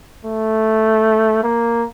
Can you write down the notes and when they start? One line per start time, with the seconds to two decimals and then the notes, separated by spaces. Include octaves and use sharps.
0.25 A3
1.43 A#3